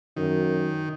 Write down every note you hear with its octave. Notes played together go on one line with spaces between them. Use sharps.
F#2 D#3